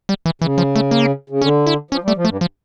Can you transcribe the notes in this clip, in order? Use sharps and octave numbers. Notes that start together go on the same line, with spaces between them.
G3
E3
C#3 E3
F3
A3
A#3
C#3
D3 C#4
E4
F3 C#4
G3
A3
F3
A3
G2
F3